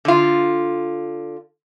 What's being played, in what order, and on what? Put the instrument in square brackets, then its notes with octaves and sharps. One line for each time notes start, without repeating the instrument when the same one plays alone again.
[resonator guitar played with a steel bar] D3 F4